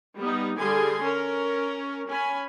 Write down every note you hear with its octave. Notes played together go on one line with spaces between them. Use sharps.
G3 B3 D#4
D3 G3 G#4 G#5 C6
C#4 A#4
C#4 G#5 B5